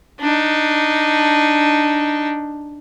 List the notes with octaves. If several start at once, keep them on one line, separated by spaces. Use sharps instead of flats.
D4 D#4